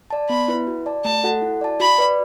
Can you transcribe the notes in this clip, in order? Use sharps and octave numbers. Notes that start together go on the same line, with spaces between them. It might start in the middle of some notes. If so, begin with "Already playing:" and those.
D5 A5
B3 B5
E4 B4
F#4
D5 A5
A3 A5
F#4 A4 F#5
E4
D5 A5
F#4 B5
B4 D5